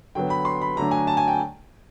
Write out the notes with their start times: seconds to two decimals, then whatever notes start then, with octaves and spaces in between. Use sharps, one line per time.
0.15 D3 F#3 B3 G5
0.30 B5
0.45 C6
0.61 B5
0.76 D3 F#3 A3 D4 A#5
0.91 G#5
1.07 A5
1.17 G#5
1.28 G5